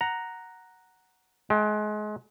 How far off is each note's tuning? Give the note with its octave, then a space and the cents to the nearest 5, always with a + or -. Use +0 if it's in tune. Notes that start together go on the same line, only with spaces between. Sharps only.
F#5 +0 A#5 +0
G#3 +30 G5 +0